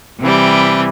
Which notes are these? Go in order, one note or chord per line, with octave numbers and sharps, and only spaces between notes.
C3 E3 G3